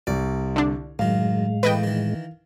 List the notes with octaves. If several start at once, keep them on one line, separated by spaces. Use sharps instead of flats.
C2 D5
D3 D4
F#2 A2 D#3 G#3 F5
E3 A3 A#3 B4 D#5 G5
D#3 E3